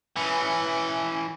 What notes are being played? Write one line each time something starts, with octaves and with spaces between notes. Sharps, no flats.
E3 C#4